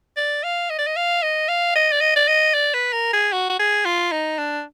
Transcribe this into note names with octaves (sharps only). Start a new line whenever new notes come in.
D5
F5
D#5
D5
D#5
F5
D#5
F5
D#5
D5
D#5
D5
D#5
D5
B4
A#4
G#4
F#4
F#4
G#4
F4
D#4
D4